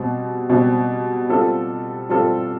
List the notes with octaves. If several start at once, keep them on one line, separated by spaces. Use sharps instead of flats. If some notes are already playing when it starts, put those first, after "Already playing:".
Already playing: B2 G3 C4
B2 G3 C4
G3 C4 F4 A4
G3 C4 F4 A4